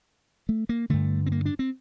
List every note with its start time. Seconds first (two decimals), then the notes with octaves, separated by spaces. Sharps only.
0.49 A3
0.69 A#3
0.90 G2 D3 A3
1.26 C4
1.32 A#3
1.45 D4
1.59 C4